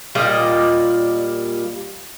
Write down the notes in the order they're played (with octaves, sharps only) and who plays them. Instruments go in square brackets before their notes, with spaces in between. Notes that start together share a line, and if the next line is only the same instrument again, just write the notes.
[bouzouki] A#2 G3 D5 D#5